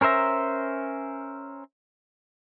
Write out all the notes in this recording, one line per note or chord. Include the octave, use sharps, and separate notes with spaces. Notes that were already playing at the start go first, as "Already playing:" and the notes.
C#4 A#4 C5 E5 A#5